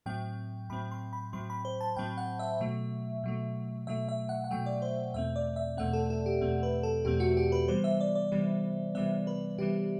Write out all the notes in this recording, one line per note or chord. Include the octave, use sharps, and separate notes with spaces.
A2 F#3 C4 G5
A2 F#3 C4 B5
C6
B5
A2 F#3 C4 C6
B5
C5
A5
A2 F#3 C4 G5
F#5
E5
B2 F#3 A3
B2 F#3 A3
B2 F#3 A3 E5
E5
F#5
F#5
B2 F#3 A3 G5
D5
C5
E2 B2 A3 C4 E5
D5
E5
E2 B2 A3 C4 F#5
A4
A4
G4
E2 B2 A3 C4
B4
A4
E2 B2 A3 C4 G4
F#4
G4
B4
C3 E3 G3 B3 C5
E5
D5
D5
C3 E3 G3 B3
C3 E3 G3 B3 E5
B4
C3 E3 G3 B3 G4